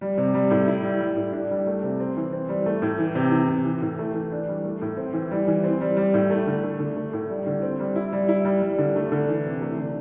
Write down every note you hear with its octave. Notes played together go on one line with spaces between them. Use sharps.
G3
C3
G3
A2
E4
G3
G3
A2
D4
G3
A3
C3
C4
E3
C4
G3
A3
A2
E3
C3
E3
C3
E3
A2
A3
E3
D4
G3
A3
A2
C4
E3
G3
E3
C4
G3
G3
A2
A3
D3
A3
D3
A3
A2
G3
D3
C4
G3
E4
G3
E4
G3
G3
D3
A3
D3
E3
C3
A3
D3